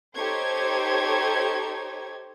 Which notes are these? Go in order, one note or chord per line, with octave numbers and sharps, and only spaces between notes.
D#4 G4 A4 C5 C#5 G#6